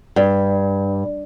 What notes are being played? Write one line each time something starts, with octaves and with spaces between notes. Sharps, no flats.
G2